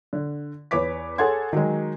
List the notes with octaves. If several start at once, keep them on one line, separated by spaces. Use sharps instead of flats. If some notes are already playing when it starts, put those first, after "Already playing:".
D3
E2 B4 C#5 D6 B6
G#4 A4 C#5 F#5 C6 G#6
D#3 F#3 G#3